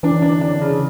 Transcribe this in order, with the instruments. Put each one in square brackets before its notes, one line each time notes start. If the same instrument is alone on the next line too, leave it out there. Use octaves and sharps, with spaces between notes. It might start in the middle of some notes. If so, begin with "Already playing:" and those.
[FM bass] E3 [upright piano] D4
[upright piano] D4
D4
C#3